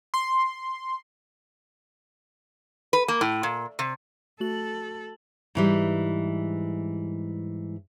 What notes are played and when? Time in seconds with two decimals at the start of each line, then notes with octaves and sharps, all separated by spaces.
0.14 C6
2.93 B4
3.08 A#3
3.21 A2
3.43 A#2
3.79 C3
4.40 A3 F#4 A4 F#7
5.55 G#2 E3 G3